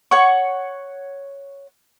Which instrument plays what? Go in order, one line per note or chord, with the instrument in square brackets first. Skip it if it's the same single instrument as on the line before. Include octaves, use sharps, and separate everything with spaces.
[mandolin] C#5 F#5 C#6